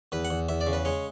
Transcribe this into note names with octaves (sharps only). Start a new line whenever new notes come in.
E2 B4
F#5
E2
E2 E5
D5
C#3
B4
G#3 C#5